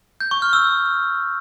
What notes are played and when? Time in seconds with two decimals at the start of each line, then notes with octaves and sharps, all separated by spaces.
0.20 G6
0.31 C#6
0.42 F6
0.53 E6